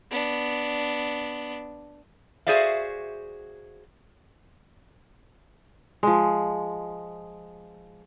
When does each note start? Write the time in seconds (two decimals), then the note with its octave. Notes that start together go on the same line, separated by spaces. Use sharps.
0.11 B3 D4
2.47 F#4 G#4 C5 D5 E5 F5
6.03 F3 G#3